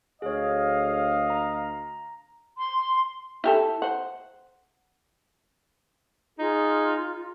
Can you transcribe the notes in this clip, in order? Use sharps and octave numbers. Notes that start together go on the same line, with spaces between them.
D2 G#4 C#5 D#5 F5
A#5
C6
E4 G4 A4
C5 F#5
D#4 F4 G#4